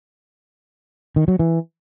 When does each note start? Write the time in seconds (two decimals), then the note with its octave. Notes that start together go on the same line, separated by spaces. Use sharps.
1.16 D#3
1.28 F#3
1.39 E3